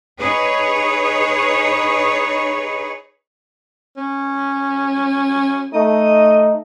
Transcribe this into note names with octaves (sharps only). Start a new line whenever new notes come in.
D#4 G#4 B4 C#5
C#4
A3 D#4 D#5